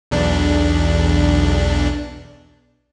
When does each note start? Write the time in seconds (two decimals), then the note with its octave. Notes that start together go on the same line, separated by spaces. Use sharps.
0.11 B1 E2 D4